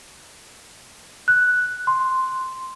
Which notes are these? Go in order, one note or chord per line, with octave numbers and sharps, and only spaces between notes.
F#6
C6